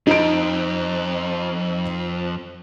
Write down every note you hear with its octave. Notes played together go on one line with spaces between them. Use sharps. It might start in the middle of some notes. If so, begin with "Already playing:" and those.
F2 D#4 D7